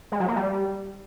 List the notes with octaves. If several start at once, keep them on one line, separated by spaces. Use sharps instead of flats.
G#3
F#3
A#3
G3